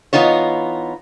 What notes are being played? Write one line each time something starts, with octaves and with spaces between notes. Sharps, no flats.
E3 B3 D#4 F4 C#5